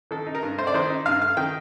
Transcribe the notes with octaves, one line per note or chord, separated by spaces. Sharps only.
D#3 A4
D#4
A#4
G2
A3 C5
D5
D#3 C5
D#4
G2 F5
A3 F5
D#3 G5